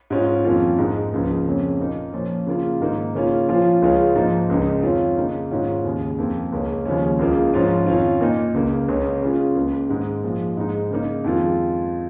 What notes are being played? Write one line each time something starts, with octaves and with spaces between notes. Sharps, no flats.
G#2 G#3 C#4 F4
F2 D#3 A#3 C#4 F4
G#2 G#3 D#4
C#2 C#3 F3 A#3
F2 C#3 A#3 C#4
A#2 A#3 D#4
A#2 F3 C#4 F4
C#3 A#3 F4
G#2 D#3 A#3 D#4
C#3 A#3 C#4 F4
A#2 F3 C#4 F4
C#2 C#3 G#3 C#4 F4
G#2 F3 A#3 D#4
C#2 C#3 G#3 D#4
F2 D#3 C#4 F4
C#3 A#3 D#4
G#2 D#3 C#4 F4
D#2 C#3 G#3
F2 D#3 A#3
C#2 C#3 A#3 C#4
D#2 C#3 F3 G#3 C#4
C#2 C#3 A#3 F4
G#2 F3 C#4 F4
F2 D#3 C#4 F4
A#2 A#3 D#4
C#2 C#3 A#3
C#2 C#3 A#3 C#4
C#3 G#3 C#4 F4
C#2 C#3 A#3
G#2 D#3 G#3
A#2 F3 G#3
G#2 G#3 D#4
C#3 A#3 D#4
F2 D#3 G#3 F4